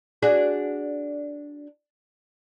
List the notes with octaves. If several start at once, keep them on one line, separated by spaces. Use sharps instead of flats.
D4 F#4 G#4